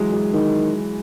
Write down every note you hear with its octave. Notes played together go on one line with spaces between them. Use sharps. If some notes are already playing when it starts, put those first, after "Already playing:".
Already playing: E3 F#3 G#3
G#3
D#3